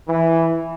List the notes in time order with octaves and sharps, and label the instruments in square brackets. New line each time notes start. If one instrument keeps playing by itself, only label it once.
[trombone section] E3